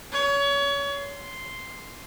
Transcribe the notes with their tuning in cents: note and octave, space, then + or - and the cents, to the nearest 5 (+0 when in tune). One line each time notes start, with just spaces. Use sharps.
C#5 +30
C6 +0